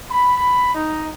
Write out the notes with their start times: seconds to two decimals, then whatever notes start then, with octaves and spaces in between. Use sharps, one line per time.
0.11 B5
0.75 D#4